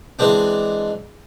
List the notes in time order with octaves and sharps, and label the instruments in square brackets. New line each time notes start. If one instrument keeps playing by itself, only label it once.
[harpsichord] E3 G#3 C4 D4